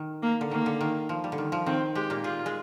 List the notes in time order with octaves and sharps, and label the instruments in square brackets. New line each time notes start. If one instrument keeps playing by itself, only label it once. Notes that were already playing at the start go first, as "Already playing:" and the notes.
Already playing: [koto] D#3
[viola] A#3
[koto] D3
[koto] D#3 [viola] A#3
[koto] D3
D#3
F3
G3
D3
D#3
F3
[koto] D#3 [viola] C4
[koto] G#3 [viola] G4
[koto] A#2 A#3
[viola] F4 [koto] G#4
[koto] G#3 G#4